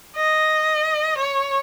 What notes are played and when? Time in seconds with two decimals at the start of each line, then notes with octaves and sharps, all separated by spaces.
0.16 D#5
1.18 C#5